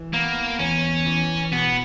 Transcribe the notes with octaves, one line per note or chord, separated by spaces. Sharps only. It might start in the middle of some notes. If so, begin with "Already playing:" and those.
Already playing: E3
A#3 B3
E2 C#4
E3
B2 B3